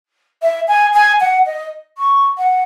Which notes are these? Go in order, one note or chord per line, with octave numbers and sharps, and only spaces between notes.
E5
G#5
G#5
F#5
D#5
C#6
F#5